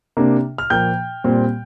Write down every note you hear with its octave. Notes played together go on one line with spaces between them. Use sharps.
C3 A#3 D4
F6
A#2 F3 A#3 G5 G6
A#2 G3 C4